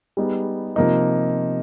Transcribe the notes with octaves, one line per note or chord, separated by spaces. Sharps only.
G3 B3 D#4 G#4
C3 F3 A#3 D#4